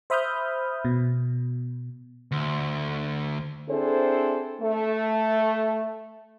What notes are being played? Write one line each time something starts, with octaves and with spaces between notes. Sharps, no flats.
C5 E5 B5 D#6 F6 G6
B2
D2
C4 D4 E4 G#4 A4 C5
A3